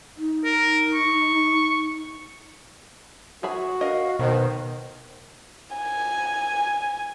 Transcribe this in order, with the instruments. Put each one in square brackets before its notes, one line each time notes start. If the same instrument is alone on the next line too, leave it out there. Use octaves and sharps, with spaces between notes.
[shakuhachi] D#4
[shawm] A#4
C#6
[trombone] F#4 [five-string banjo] G#4 E5 B5
[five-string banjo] A#4 D#5 [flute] F5
[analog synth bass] B2 [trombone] D#3 [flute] C5
[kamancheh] G#5